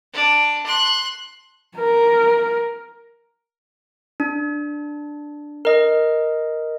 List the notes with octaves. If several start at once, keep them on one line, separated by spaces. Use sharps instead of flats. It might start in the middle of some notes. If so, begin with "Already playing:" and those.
D4
C6 F#6
A#4
D4
A#4 D#5